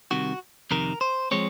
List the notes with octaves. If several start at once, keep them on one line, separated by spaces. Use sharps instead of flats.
C2 C3 D#3 F#4
F2 C3 D#3 A#4
C5
F3 G#3 C4 C#5